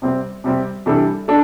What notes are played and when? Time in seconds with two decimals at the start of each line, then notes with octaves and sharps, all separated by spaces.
0.02 C3 G3 C4 G4
0.44 C3 G3 C4 G4
0.86 C3 E3 G3 D4 A4
1.28 D4 A4